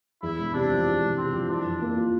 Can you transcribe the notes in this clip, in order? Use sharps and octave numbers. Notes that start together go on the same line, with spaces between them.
E2 E4
E1
C3 D4
F3
E2
E1
C3 C4
F3
E3 D4
F2
A#3
F4